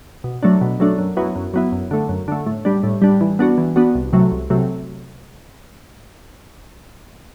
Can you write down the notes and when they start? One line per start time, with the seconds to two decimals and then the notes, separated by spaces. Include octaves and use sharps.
0.24 B2
0.43 F#3 A3 D4
0.61 B2
0.80 F#3 A3 D4
0.98 F#2
1.17 F#3 B3 E4
1.35 F#2
1.54 F#3 B3 E4
1.72 F#2
1.91 D3 A3
2.09 F#2
2.28 D3 A3
2.46 A2
2.65 G3 D4
2.83 A2
3.02 G3 D4
3.21 E3
3.39 B3 D4 F#4
3.58 E3
3.76 B3 D4 F#4
3.95 C2
4.13 C3 F#3 A3
4.31 C2
4.50 C3 F#3 A3